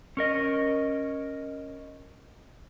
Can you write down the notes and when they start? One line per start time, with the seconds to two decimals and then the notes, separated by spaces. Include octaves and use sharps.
0.17 C#4 A#4 D#5